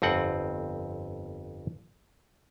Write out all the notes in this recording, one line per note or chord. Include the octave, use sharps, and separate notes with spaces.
G1 F2 C4 F#5